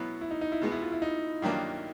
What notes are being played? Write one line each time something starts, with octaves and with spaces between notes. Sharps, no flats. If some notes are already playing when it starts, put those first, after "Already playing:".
Already playing: B2 F#3 B3 E4
E4
D#4
D#4
E4
B2 G#3 B3
E4
F4
E4
D#4
G2 D#3 F#3 A#3 D4